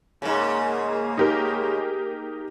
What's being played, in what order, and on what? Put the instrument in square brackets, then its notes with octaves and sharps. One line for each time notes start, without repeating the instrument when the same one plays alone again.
[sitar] G#2 C#3 [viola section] A#3 G#4
[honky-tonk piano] D#4 G4 A#4